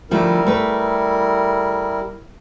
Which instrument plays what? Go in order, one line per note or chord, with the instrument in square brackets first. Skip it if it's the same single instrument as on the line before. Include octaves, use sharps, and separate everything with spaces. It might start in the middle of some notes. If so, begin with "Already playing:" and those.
[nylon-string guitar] D3 F3 A3 [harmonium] G3 E4 A#4
[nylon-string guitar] A3 B4